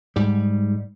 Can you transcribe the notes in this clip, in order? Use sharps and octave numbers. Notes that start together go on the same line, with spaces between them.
G#2 G3